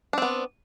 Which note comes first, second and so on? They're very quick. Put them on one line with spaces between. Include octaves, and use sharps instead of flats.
D4 C4 B3